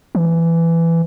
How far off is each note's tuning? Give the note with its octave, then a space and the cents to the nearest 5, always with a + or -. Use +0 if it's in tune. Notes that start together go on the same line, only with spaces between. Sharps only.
E3 +15